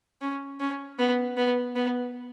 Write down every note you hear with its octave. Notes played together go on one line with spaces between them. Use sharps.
C#4
C#4
B3
B3
B3